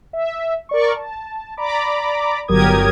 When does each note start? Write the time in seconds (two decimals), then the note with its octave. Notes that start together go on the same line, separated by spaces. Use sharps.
0.13 E5
0.69 A#4 D5 C#6
0.96 A5
1.57 D5 A#5 B5 D6
2.48 G1 F#3 G4 A#4 D#6 G#6